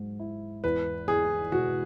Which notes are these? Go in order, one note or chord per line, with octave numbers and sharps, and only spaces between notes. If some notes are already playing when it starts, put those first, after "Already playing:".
Already playing: G#2 F#3
E4
E2 B4
E2 G#4
E1 F#4